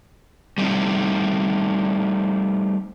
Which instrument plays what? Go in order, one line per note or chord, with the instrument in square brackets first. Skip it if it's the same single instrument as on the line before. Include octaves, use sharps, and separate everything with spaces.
[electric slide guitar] G3 A3 C4 D#4